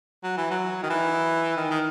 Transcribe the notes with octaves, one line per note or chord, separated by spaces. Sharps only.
F#3
E3
F#3
D#3
E3
D#3
D#3